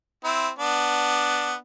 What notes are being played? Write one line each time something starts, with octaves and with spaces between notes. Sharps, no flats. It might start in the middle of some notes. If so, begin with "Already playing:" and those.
C4 E4
B3 D4